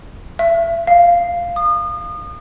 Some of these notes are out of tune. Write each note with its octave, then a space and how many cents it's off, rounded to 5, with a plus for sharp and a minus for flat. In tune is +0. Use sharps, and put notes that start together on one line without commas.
E5 +35
F5 -5
D#6 -35